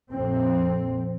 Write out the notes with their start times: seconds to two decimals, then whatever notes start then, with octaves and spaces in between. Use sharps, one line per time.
0.10 A#1 F2 C4